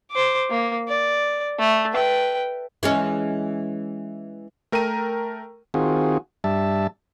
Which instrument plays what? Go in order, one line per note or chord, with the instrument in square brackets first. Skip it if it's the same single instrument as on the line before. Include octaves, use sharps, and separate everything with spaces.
[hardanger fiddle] C5 D6
A#3
D5
A3
B4 G5
[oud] E3 G#3 C#4
[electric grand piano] A3 A#4 G5 A#5 D#7
[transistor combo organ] D#3 C4 F4 F#4 G#4
G2 G3 E5 A5